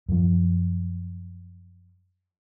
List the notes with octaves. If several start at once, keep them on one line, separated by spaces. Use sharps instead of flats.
F#2 F3